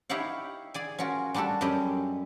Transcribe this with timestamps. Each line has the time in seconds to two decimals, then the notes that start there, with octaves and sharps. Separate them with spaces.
0.10 D#4 E4 G4 C#5 F5 F#5
0.74 G#4 D5 G#5
0.99 C#4 F4 F#4 A#4
1.34 G3 D4 F#4 G4 A4
1.61 F#2 G3 C#4 G4 D#5